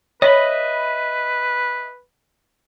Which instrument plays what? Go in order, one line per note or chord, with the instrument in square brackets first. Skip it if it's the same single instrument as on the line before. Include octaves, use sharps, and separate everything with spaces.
[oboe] B4 [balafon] C#5 [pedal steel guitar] D#5 E5 B5